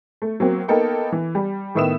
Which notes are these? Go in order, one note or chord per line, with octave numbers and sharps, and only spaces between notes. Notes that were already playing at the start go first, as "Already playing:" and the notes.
A3
F#3 A#3 C4
A#3 B3 D#4 A4 A#4 G5
E3
G3
A2 D#3 B3 E5 D#6 E7